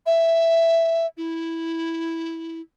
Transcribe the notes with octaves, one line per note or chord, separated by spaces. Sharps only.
E5
E4